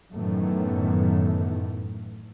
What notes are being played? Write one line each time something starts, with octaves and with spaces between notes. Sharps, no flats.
F#2 A2 D#3 E3 A3 B3